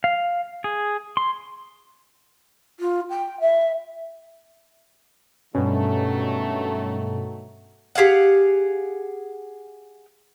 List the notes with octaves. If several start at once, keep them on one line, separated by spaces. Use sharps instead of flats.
F5
G#4
C6
F4
G5
E5
G2 B2 D#3 F#3 A3 C#4
G4 G#4 F5 F#5